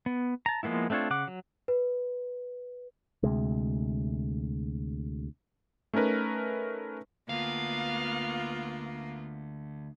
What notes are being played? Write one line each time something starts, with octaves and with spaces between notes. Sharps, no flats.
B3
A5 A#5
F3 G#3 A#3 B3 E4
A3 C4 D4 F4 C#5
C#3 F#5 D6
F#3
B4
D2 C3 G#3
A3 C#4 D#4 A#4 B4
D2 A#3 B3 F4 F5